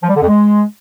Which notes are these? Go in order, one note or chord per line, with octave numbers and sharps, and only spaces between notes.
F3
G3
D3
F2
G#3